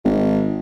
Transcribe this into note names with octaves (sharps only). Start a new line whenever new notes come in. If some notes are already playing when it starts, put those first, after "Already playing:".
G#1